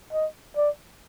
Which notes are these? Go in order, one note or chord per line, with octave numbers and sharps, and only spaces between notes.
D#5
D5